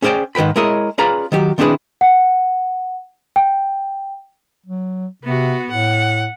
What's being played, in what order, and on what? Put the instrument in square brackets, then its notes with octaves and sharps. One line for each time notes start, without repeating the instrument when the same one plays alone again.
[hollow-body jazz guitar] C#4 G#4 C5 D5 G5
G#2 D#3 B4 G5 B5
G#3 E4 G#4 A#4 C#5 D#5
C#4 F4 G#4 B4 D5 A#5
D#3 F#3 G4
D#3 C4 D4 E4 G#4 B4
[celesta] F#5
G5
[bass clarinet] F#3
[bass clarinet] C3 [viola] B3 F#4
[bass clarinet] A2 [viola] F#5